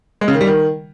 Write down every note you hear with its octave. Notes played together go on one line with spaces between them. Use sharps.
G#3
C#3
D#3
G3
D#3